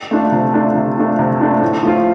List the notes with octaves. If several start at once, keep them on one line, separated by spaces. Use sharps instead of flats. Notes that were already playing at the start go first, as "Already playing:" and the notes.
A3 D4 F4
C3
A3 D4 F4
C3
A3 D4 F4
C3
A3 D4 F4
A2
F3 A3 F4